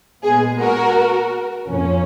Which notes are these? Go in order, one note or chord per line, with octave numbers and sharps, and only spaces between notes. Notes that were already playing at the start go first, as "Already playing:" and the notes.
A#2 G#3 B3 G#4
F#4 A#4
F2 F3 A#3 C#4